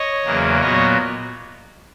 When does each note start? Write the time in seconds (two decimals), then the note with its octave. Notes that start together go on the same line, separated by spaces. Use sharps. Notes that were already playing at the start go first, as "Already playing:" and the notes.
Already playing: C#5 D#5
0.24 E2 C#3 F#3 A#3
0.61 A#2 F#3 B3 C#5 D#5